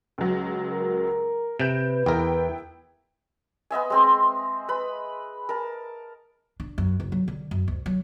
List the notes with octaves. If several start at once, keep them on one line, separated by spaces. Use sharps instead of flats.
C#2 F#3
A#4
C3 B4 G6 D7 E7
E2 B3 E4 A#4 G5
B3 D#5 E5 G#5
G#3 C4 C6
B4 B5
A#4 A5
D4
F#2
F#1
F#3
D3
F#2
D2
F#3